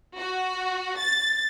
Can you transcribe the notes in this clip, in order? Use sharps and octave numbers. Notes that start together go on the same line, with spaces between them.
F#4
A6